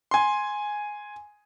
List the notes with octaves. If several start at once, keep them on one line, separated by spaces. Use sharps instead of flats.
G#5 C6